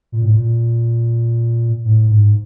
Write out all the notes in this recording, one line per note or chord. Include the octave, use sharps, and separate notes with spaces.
A#2
A2
A#2
A2
G#2